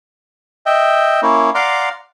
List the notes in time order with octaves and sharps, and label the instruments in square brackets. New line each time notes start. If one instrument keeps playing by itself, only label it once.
[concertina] D#5 E5 G5
A#3 C#4 E4
D5 F5 F#5 A#5 C6 D6